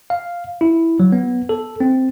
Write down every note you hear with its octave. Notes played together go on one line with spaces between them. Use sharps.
F5
E4
F#3
B3
A4
C4